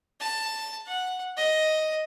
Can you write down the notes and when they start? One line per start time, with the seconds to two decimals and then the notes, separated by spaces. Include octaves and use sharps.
0.20 A5
0.87 F#5
1.37 D#5